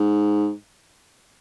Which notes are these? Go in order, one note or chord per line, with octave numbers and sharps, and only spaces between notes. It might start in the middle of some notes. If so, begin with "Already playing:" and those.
Already playing: G#2